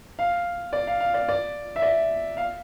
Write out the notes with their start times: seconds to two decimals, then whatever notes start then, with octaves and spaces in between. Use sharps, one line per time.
0.19 F5
0.73 D5
0.87 F5
1.00 F5
1.14 D5
1.28 D5
1.76 E5
1.82 D5
2.37 F5